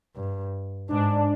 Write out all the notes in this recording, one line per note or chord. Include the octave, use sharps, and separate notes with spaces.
G2
G#2 D4